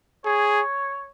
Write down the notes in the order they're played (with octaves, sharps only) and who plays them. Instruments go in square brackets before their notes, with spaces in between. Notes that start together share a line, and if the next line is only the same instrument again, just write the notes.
[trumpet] G#4 [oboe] C#5